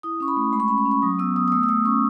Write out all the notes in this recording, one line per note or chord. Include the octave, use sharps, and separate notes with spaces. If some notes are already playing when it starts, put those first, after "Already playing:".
E4 D#6
C#4 C#6
B5
A3
G#3 B5
C#6
C#4 B5
C#6
C#4
C#6
F#3 D#6
B3 E6
B3 D#6
D#6
A3 E6
E6
A3 D#6
C#4 C#6